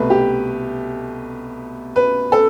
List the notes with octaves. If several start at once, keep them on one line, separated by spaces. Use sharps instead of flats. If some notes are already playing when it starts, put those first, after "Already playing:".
Already playing: C2 B2 A3 B4
G4
B4
A4